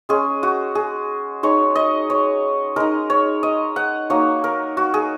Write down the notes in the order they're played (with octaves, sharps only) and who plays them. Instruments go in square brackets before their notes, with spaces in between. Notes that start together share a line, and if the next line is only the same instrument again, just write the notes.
[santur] G#3 C#4 G#4
F#4
G#4
G#3 D#4 C#5
D#5
C#5
G#3 D#4 A#4
C#5
D#5
F#5
F#3 A#3 D#4 C#5
A#4
F#4
G#4